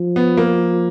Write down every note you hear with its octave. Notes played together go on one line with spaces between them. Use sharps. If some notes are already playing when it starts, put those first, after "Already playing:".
Already playing: F3
B3
A#3